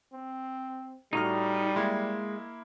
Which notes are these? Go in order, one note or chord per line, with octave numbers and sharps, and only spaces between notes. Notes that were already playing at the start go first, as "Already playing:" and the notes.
C4
A2 G3 D#4 F#4 F6
G#3 A#3 E4 C6